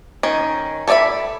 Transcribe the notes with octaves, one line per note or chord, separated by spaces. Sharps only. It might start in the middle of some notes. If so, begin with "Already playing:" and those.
D#3 C#4
A4 C#5 D5 E5 B5